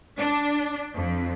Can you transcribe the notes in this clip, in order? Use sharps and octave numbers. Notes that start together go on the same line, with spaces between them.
D4
F2